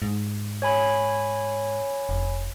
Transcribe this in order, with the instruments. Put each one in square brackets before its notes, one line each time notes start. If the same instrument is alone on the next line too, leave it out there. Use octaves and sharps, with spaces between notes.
[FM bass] G#2
[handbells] C#5 G#5 B5
[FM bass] F1